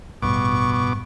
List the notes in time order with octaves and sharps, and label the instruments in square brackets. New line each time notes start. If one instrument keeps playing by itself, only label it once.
[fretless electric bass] A1 G2 [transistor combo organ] B2 D6 [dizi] C#6